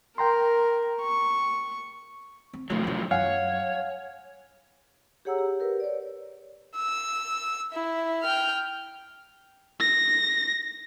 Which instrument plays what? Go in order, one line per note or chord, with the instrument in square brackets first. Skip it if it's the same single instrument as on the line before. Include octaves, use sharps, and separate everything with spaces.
[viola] A#4 [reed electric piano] G5 A#5 C6
[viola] C#6
[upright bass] C4
[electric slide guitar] A2 F3 F#3 [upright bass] D3 A3
[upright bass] D3 E3
[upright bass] F#2 F#3 [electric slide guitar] C#5 [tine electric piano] F5 F#5 G#5
[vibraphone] G4 G#4 C#5 F#5 A#5 E6
G4
G4 A#4 B4
C#5 D5
[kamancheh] E6
E4
G5 F6
[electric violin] A#6